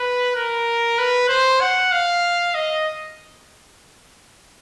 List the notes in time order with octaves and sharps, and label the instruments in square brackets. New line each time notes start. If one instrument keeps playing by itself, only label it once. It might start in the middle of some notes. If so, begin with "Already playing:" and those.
Already playing: [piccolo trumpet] B4
A#4
B4
C5
F#5
F5
D#5